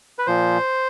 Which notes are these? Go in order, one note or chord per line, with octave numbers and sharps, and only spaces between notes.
B4
A#2 F3 C5